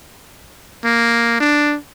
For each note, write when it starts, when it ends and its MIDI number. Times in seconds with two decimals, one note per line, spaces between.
0.85 1.40 58
1.41 1.76 62